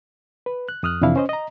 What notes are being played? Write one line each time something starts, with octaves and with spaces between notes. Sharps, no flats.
B4
F#6
F2 D#6 F6 F#6
F2 C3 E3 D4 E4 F5
C#4 C5 D#5
D#5 A#5